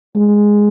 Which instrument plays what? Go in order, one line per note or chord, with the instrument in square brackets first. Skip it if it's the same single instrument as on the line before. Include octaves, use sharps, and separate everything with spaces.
[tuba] G#3